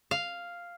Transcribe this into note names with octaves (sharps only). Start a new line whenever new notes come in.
F5